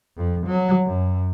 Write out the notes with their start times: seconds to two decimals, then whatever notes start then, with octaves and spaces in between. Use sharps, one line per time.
0.17 F2
0.47 F#3
0.86 F#2